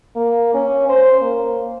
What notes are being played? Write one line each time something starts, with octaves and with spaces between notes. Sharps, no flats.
A#3
C#4
C5
A#3